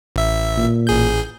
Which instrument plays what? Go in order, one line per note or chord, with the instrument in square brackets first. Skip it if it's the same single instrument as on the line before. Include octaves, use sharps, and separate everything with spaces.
[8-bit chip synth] A1 E5
[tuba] A#2
[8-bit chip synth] A1 G#4 G6